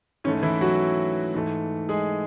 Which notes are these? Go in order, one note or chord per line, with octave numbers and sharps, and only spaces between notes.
G#2 E3 A3 C#4
E3 E4
F#3 F#4
G#2 E3 A3
G#3 G#4